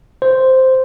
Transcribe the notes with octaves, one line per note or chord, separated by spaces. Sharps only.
C5